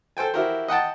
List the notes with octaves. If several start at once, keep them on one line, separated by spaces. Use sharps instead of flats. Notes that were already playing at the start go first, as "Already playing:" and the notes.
A4 C5 G5 G#5
E4 F#4 G4 A#4 C5
D#5 F#5 G5 A5